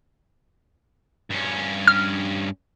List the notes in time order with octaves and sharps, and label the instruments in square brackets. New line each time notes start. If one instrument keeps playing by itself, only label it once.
[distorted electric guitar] G2 C#4
[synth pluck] F6